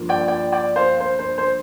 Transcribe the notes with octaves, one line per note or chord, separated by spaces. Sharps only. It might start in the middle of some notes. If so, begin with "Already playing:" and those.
Already playing: G2 F3 A#3 F4
D5 G5
D5 G5
D5 G5
C5 F5
C5
C5
C5